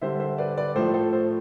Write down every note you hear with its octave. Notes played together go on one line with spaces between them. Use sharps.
D3 G3 C5 E5
C5 E5
B4 D5
B4 D5
A2 F3 A3 A4 C5
A4 C5
A4 C5